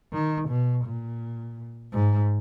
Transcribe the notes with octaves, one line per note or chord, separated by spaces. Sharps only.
D#3
B2
A#2
G#2